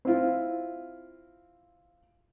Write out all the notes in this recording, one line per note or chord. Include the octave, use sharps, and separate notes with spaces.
C4 E4 F4